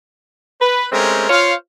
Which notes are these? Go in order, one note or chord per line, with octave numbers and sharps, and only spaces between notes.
B4
G#3 A3 C4 C#4 G4 A#4
F4 C5 C#5 F5